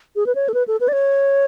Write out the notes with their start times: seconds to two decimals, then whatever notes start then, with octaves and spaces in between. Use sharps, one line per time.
0.16 G#4
0.26 B4
0.35 C#5
0.49 A4
0.54 B4
0.68 A4
0.80 B4
0.88 D5
0.93 C#5